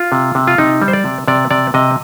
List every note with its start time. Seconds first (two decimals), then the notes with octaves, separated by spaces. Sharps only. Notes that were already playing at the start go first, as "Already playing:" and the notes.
Already playing: F4
0.12 C3
0.35 C3
0.47 F4
0.58 C3 D#4
0.82 G3
0.88 C5
0.93 D5
1.05 C3
1.28 C3 D5
1.51 C3 D5
1.74 C3 D#5